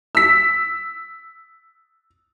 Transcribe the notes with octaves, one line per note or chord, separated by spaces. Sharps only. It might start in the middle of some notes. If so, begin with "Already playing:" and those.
E6 B6